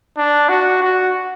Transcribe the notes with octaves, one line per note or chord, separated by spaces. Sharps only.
D4
F#4
F#4